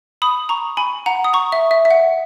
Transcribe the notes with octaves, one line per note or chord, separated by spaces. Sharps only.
B5 D#6
A#5 C#6
G#5 B5
F#5 A#5
D#6
A#5 C#6
E5
E5
E5
F#5